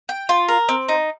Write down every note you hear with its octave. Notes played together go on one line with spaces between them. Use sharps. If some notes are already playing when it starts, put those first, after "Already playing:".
G5
F4
A#4
C4
D#4